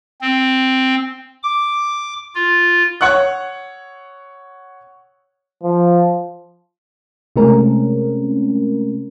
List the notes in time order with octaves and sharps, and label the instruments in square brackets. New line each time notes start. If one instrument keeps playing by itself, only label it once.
[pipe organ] C4
D6
F4
[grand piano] C#5 F#5 C#6 F#6
[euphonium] F3
[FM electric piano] C3 G#3 A3 C4 C#4 A#4